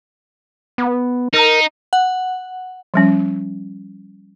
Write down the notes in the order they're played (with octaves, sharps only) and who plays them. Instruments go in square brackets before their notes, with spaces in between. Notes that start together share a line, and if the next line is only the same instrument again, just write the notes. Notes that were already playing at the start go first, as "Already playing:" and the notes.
[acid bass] B3
[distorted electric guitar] D#4 [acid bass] A#4
[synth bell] F#5
[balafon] F3 G3 C#4